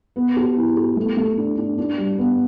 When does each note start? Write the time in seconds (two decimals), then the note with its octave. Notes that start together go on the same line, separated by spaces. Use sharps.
0.16 B3
0.36 G4
0.57 E4
0.77 G4
0.97 A3
1.17 A3
1.38 D4
1.57 D4
1.78 D4
1.98 G3
2.18 B3